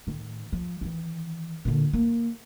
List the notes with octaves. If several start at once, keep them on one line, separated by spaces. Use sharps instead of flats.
A2 D#3
F3
D#3 E3
A#2 D3
A#3